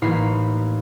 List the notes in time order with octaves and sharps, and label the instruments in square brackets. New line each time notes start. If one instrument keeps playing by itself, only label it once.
[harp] A1 A#3 D#4 F5 B5 C7